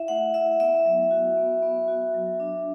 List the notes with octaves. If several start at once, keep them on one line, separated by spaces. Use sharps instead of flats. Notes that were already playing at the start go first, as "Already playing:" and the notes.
Already playing: E4 E5
A3 F#5
E4 E5
B3 E5
F#3
F#4
B3
B3
F#4
F#3
D4